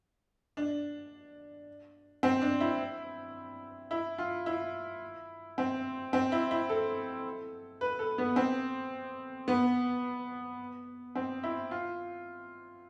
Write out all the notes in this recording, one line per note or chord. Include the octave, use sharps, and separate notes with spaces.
D4
C4
D4
E4
E4
F4
E4
C4
C4
E4
E4
A4
B4
A4
B3
C4
B3
C4
E4
F4